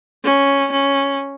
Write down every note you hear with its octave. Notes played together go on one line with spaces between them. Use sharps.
C#4
C#4